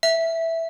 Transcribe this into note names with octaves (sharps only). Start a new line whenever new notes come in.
E5